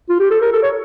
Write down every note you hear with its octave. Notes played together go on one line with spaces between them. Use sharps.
F4
G4
A4
A#4
A4
C#5